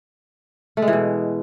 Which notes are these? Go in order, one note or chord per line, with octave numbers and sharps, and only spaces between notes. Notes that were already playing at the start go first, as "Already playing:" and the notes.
A3
G#3
E3
B2